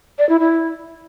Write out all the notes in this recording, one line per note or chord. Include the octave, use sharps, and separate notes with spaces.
D5
E4
E4